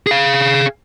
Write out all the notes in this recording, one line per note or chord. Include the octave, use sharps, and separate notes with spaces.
G#4 F5